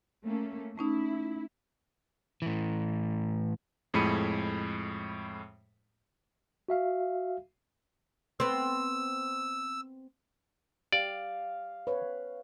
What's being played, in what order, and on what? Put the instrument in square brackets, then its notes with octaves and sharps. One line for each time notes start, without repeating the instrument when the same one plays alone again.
[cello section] A3 A#3 C#4
[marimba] A3 C#4 D#4 [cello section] E4
[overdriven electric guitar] A2 E3
[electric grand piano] F2 A2 G#3 B5 C#7 D#7
[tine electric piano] F#4 E5 F5
[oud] B3 C4 [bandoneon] E6
[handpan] G4 [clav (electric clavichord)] D5 [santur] F5
[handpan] B4 C#5